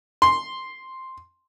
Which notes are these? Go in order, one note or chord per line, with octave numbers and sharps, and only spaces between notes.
C6